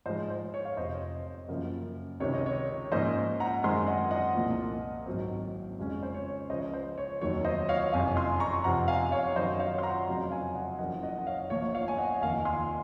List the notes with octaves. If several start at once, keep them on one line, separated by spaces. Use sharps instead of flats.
G#2 F3 G#3 C5 D#5
C5
C#5
F5
F1 F2 C3 C5 D#5
F#2 C#3 F3 A#3
C#2 C3 D#3 C#5
D#5
C#5
G#2 F3 A#3 C#4 C5 D#5
F#5 A#5
F#2 D#3 G#3 C4 G#5 C6
D#5 F#5
D#5 F#5
C2 A#2 F3
G#1 G#2 F#3 C4
F2 C#3 G#3 C#4
C5
C#5
C#2 C#3 F3 C5 D#5
C5
C#5
F1 D#2 D#3 F#3 C#5
C5 D#5
C#5 F5
F#1 F2 C3 F5 G#5
G#5 C6
A#5 C#6
F1 F2 C3 F3 F#5 A#5
F5 G#5
C#5 F5
F#2 D#3 F#3 C5 D#5
C#5 F5
C6
F#5 A#5
F1 F2 C#3 F#3
F5 G#5
D#5 F#5
F#1 F#2 F3 D#5 F#5
D#5 F#5
F#5
C#5 F5
A#1 A#2 F3 C#5
C#5 F5
G#5
D#5 F#5
F1 D#2 D#3 F5 G#5
G#5 C6